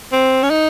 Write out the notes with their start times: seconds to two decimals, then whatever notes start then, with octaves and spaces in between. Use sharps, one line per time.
0.12 C4
0.43 C#4
0.50 D#4